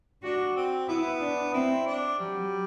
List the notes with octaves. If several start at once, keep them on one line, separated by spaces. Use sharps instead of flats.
D4 F#4
C4
B3 E4
D4
C4 E4
D4
F#3 G3